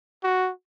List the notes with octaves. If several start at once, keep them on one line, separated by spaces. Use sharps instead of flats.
F#4